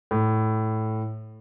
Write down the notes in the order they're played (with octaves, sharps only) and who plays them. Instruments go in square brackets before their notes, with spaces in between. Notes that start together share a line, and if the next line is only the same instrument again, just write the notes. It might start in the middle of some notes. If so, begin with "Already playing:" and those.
[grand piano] A2